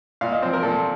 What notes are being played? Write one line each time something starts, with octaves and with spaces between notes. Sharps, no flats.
A#2 F5
D#5
F3 C4 C5
A#4
A#2 A4